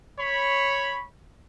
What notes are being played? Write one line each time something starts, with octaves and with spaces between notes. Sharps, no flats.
C#5 B5